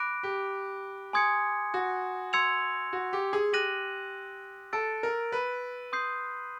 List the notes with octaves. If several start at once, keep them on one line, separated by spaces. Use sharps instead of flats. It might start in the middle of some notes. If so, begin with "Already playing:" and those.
Already playing: B5 D6 F#6 A#6 D7
G4
G#5 C6 D#6 G#6 C#7
F#4
C6 E6 G#6 C#7 F7
F#4
G4
G#4
G4 F#6 A#6 D#7 F#7
A4 E6 A6 D7
A#4
B4
C6 D#6 G6 C7